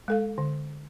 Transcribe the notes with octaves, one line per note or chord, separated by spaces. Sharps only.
G#3 A4 F5
D3